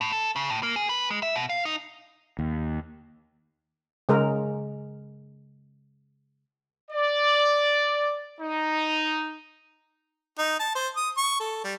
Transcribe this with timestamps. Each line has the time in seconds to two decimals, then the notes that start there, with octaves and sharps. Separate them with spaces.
0.01 A2
0.13 A4
0.36 C#3
0.50 A2
0.63 A#3
0.76 G#4
0.89 B4
1.10 G#3
1.23 E5
1.35 B2
1.49 F5
1.65 D#4
2.39 D#2
4.09 C#3 G#3 A#4
6.91 D5
8.41 D#4
10.38 D#4
10.59 A5
10.75 C5
10.97 D#6
11.18 C#6
11.40 A4
11.64 G3